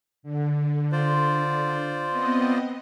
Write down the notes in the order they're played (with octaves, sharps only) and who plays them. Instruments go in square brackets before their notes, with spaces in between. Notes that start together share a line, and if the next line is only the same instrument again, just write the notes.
[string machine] D3
[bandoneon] F4 C5 D5
[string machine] B3 C4 D#5